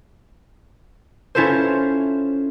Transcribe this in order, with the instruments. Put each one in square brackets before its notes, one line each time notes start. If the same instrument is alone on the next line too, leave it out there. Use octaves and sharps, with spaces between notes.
[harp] C#4 E4 F4 A4 C5